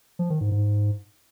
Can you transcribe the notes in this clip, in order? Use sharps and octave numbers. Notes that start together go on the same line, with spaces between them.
F3
D#3
G#2
G#2